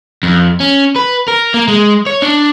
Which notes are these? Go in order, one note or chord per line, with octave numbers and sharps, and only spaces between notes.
F2
C#4
B4
A#4
A#3
G#3
C#5
D4